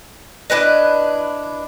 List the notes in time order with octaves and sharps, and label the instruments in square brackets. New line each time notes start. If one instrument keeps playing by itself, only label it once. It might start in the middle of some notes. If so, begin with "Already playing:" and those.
[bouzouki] D4 E4 B4 D#5